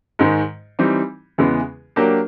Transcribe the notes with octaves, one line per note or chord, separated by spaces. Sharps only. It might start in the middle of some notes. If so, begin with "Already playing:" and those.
G#2 D#3 G#3
E3 G3 C4 D#4
E2 C#3 E3 G#3 B3
F#3 A#3 D4 G4 A#4